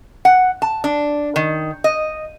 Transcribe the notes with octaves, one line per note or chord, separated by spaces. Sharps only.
F#5
A5
D4
D#3
D#5